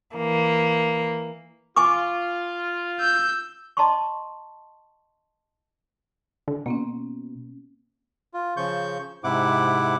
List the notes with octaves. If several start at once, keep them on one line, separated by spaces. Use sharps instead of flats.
E3 A#3
F4 G#5 C#6 D6
E6 G6
D#5 A5 A#5 C6 C#6
D3
B2 A#3 C4 C#4
F4
C#3 F3 C#6 G6
G#2 C3 E4 F#5 D6